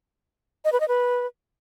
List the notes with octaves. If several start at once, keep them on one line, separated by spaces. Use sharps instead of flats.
D#5
B4
D#5
B4